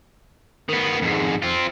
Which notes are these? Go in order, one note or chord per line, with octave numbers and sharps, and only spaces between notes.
D#3 B3
F2 G#2
C4 F4